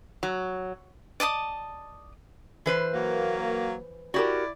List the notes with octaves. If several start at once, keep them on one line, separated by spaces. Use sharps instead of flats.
F#3
D5 D#5 A5 D#6
E3 B4 C5
F#3 A#3
E4 F#4 G4 A#4 D5